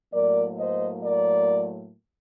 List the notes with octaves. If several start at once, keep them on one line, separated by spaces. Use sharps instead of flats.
A2 F#3 A#3 A#4 D5
C5 D#5
A#4 D5